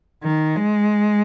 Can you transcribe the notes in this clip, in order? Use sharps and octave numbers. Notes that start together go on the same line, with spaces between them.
D#3
G#3